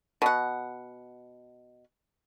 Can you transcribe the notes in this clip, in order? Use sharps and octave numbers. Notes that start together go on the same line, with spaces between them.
B2 F#5